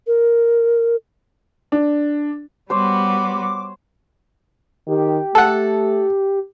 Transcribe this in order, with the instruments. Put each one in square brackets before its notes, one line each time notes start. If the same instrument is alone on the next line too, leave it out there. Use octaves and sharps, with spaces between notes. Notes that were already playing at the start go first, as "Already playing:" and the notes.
[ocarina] A#4
[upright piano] D4
[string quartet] G3 B3 F#4 [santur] C5 C#5 [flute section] D6
[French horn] D#3 [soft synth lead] G4
[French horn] A3 [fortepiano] A4 F#5